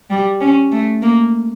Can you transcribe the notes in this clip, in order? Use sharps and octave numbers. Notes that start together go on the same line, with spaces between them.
G3
C#4
A3
A#3